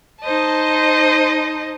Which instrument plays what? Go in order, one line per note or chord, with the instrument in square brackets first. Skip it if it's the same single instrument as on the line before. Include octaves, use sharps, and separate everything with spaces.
[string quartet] D#4 C5 D#5 A5